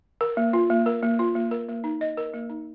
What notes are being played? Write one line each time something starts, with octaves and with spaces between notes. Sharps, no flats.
A#4
A#3
F4
A#3
A#4
A#3
F4
A#3
A#4
A#3
D#4
D#5
A#4
A#3
D#4